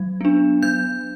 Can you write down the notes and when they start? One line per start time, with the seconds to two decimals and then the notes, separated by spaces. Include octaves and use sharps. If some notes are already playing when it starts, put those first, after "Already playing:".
Already playing: F#3
0.21 B3 D4
0.63 F#3 G6